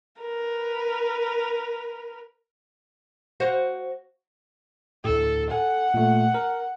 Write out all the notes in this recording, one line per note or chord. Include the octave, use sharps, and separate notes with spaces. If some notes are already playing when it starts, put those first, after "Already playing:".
A#4 B4
F#4 C5 F5
D2 A2 A4
A4 F#5 G#5
A#2 A3
A#4